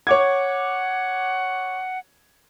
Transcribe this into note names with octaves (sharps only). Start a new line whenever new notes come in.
C#5 F#5 D6 G#6